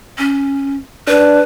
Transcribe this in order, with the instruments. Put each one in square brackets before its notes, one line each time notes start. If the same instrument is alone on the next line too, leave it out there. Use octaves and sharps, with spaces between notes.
[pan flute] C#4
[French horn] D4 [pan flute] B4